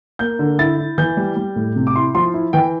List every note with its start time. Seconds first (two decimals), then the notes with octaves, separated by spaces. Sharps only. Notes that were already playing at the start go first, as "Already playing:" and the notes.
0.19 A#3 G6
0.39 D3
0.59 E4 A6
0.78 E4
0.98 E3 G6
1.17 G3
1.36 G3
1.56 A2
1.76 C3
1.87 D6
1.95 E4 C6
2.15 F3 C6
2.34 E4
2.53 E3 G5